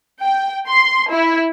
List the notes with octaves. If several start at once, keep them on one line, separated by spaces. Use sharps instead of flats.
G5
C6
E4